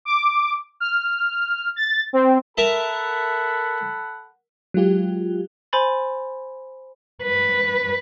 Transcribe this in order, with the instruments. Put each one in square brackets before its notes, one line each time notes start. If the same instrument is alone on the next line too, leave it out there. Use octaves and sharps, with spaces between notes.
[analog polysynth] D6
F6
A6
C4
[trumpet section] A4 F#5 B5 [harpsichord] A#4 E5 A5
[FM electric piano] F#3 G#3 F4 G4
[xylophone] C5 G#5 B5 C6 A6
[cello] B4